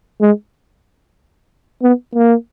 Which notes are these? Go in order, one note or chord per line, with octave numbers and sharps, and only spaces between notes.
G#3
B3
A#3